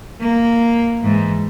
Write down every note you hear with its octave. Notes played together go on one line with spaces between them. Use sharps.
A#3
G#2 E3